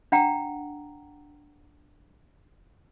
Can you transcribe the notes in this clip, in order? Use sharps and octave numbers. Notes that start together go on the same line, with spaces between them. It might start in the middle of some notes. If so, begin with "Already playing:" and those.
D4 F#5 G5 A#5